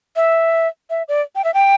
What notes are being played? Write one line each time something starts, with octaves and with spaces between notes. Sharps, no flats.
E5
E5
D5
G5
E5
G5